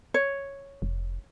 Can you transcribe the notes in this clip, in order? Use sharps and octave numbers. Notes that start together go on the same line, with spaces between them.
C#5
F1